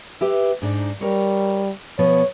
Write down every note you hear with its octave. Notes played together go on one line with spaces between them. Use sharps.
G4 B4 E5
G#2 D4 D#4
G3 A#4 C#5
B2 F3 B3 C#5